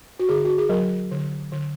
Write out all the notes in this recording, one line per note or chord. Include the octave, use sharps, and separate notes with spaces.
F#4
D3 G#4
F#4
G#4
F#3 A#4
D3
D3